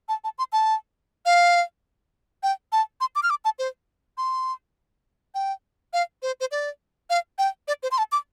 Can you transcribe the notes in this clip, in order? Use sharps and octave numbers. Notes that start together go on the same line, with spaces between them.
A5
A5
C6
A5
F5
G5
A5
C6
D6
F6
D6
A5
C5
C6
G5
F5
C5
C5
D5
F5
G5
D5
C5
C6
A5
D6